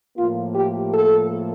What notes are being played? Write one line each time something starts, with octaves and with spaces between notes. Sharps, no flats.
A2 F3 A#3 F4
G4
A4